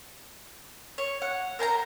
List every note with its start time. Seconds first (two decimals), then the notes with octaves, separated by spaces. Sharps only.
0.98 C#5
1.22 F#5
1.59 A#4 C5 A5 A#5